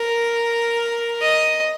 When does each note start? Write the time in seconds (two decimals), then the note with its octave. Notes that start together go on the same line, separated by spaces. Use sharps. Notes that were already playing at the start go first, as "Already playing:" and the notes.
Already playing: A#4
1.21 D#5